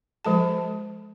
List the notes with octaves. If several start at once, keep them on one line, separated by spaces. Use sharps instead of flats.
F3 G#3 A4 A5